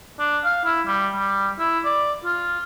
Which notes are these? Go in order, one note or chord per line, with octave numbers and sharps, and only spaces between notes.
D4
F5
E4
G3
G3
E4
D5
F4